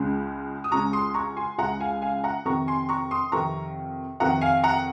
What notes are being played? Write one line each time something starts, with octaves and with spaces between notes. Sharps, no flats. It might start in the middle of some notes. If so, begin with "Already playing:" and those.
Already playing: C#2 C#3 G#3 C#4
D#6
C#2 C#3 G#3 C#4 A#5 C#6
C6 D#6
A#5 C#6
G#5 C6
C#2 C#3 G#3 C#4 F#5 A#5
F5 G#5
F5 G#5
F#5 A#5
F2 C3 D#3 A#5 C#6
G#5 C6
A#5 C#6
C6 D#6
F2 C3 D#3 A#5 C#6
F2 C3 D#3 F#5 A#5
F5 G#5
F#5 A#5